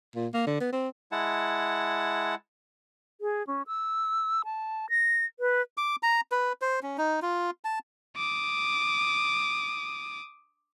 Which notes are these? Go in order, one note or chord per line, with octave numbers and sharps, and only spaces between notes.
A#2
A#3
D3
B3
C4
G#3 E4 F#5 A5
G#4
C#4
E6
A5
A#6
B4
D6
A#5
B4
C5
C#4
D#4
F4
A5
D6 D#6